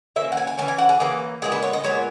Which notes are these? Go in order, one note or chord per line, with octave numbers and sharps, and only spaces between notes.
E3 A#3 C#4 E5
F#5
G#5
G#5
E3 A#3 C#4 G#5
G#5
F#5
G#4
E3 A#3 C#4 G#4
A#2 G#3 B3 G#4
B4
C#5
D#5
A#2 G#3 B3 C#5